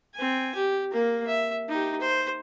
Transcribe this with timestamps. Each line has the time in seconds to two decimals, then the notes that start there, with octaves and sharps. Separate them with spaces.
0.14 C4 G#5
0.55 G4
0.92 A#3 A#4
1.27 E5
1.69 D#4 G4
2.00 C5